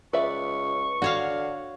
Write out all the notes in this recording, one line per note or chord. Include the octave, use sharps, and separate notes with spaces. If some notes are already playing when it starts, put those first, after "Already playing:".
C#2 B4 D5 E5 C#6
D3 F#4 C#5 F5